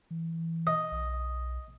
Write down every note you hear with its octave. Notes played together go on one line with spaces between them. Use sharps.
E3
D#5
B1